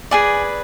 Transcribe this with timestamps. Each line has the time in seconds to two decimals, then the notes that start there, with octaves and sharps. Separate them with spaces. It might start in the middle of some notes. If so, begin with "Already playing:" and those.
0.11 G#4 B4 D5 G#5